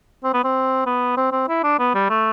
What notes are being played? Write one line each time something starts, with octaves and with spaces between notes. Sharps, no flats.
C4
B3
C4
B3
C4
C4
E4
D4
B3
G3
A3